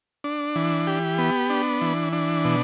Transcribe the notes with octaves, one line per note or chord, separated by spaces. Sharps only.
D4
E3
G4
B3
D4
E3
D4
B2